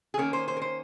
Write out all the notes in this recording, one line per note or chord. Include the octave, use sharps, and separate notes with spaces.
G#4
D#3 A#3 C#4 A#4
C5
C5
A#4
C5